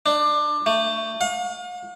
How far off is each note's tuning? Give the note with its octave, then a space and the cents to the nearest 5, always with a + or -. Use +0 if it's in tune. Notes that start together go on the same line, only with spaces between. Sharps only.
D4 +20
A3 +25
F5 +45